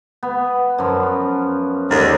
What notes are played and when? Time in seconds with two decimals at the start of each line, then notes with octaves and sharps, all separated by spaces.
0.23 B3
0.78 F#2 F3
1.91 D#2 G#2 D3